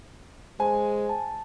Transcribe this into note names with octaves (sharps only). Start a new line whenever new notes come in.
G#3 C5 G#5
A5